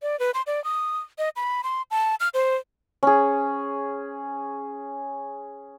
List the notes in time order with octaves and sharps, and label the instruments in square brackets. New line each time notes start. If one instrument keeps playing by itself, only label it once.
[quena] D5
B4
C6
D5
D#6
D#5
B5
C6
A5
F6
C5
[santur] C#4 G#4